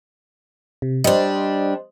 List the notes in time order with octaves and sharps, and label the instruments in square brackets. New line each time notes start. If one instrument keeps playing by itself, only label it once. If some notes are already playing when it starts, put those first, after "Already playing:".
[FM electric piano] C3
[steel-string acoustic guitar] G3 D4 [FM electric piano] C5 D#5